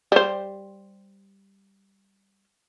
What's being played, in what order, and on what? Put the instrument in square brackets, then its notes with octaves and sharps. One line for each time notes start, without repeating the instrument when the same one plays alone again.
[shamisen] G3 C5